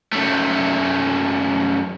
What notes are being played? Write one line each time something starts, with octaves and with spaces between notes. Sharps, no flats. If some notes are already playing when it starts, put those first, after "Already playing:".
F#2 A3